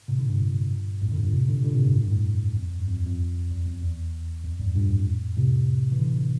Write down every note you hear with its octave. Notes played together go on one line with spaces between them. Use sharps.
A2 C3
A#2 D3
G2 A#2
F2 A2
A#2 D3
G2 A#2
A2 C3
A#2 D3
A#2 D3
A2 C3
G2 A#2
A2
G2
F2 A2
F2
F2
G2
F2
E2
F2
E2
F2
E2
F2
E2 G2
G2 A#2
F2 A2
A2 C3
E3
A#2 D3